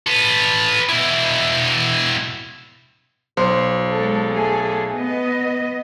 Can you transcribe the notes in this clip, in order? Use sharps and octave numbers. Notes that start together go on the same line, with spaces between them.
A4 B4
B2 E4
B1 C5
G#3 A4
A3 G#4 A4
B3 D#5